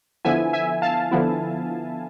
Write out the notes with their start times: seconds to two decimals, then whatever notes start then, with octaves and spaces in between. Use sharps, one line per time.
0.25 D3 F3 B3 E4 E5 G#5
0.53 E5 G#5
0.82 F5 A5
1.11 D3 F3 B3 E4